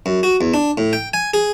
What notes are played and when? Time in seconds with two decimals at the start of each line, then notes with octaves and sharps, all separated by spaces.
0.06 F#2
0.23 F#4
0.41 E2
0.54 D4
0.78 A2
0.93 G5
1.14 G#5
1.34 G#4